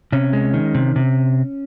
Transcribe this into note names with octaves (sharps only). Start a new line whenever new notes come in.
C3 C#4
G#3
D#3
C3
C3